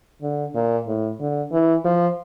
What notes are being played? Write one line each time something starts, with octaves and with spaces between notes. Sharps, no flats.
D3
A#2
A2
D3
E3
F3